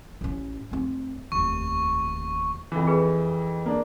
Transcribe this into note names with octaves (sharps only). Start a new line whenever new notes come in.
A1 C#4
F1 C4
F1 D#2 C#6
F2 E3
G#4 B4
A#3 D4